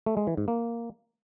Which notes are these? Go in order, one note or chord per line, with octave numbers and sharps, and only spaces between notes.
A3
G#3
E3
G#2
A#3